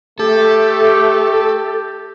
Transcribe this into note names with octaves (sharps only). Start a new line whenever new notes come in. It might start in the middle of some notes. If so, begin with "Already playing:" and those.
A3 G4 A4